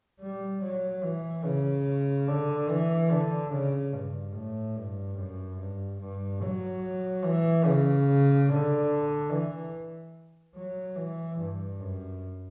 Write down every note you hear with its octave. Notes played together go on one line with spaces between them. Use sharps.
G3
F#3
E3
C#3
D3
E3
D3
C#3
G2
A2
G2
F#2
G2
G2
F#3
E3
C#3
D3
E3
F#3
E3
G2
F#2